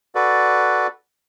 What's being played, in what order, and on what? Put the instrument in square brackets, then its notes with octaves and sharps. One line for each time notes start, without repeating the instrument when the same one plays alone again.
[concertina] F#4 A4 B4 D5